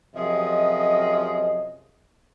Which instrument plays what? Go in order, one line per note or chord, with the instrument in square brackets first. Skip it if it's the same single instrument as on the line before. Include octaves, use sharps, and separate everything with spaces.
[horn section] F#2 C3 F3 G#4 D#5